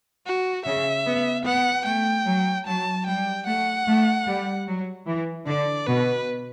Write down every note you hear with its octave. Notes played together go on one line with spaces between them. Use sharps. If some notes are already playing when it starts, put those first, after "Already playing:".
F#4
C#3 E5
B3
B3 F#5
A3 G5
F#3
F#3 A5
G3 G5
A3 F#5
A3
G3
F#3
E3
D3 D5
B2 B4